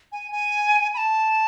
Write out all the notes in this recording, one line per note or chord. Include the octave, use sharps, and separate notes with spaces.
G#5
G#5
B5
A5